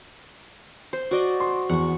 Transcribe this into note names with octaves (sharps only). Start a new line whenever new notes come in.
C5
F#4 D5 D#5
C6
E2 F#5 C#6